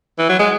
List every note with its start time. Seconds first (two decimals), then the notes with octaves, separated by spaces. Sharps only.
0.19 E3
0.29 F#3
0.39 G#3